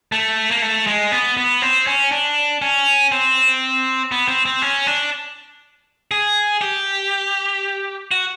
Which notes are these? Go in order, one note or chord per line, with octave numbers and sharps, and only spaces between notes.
A3
A#3
A3
G#3
B3
B3
C4
C#4
D4
C#4
C4
B3
C4
C4
C#4
D4
G#4
G4
F#4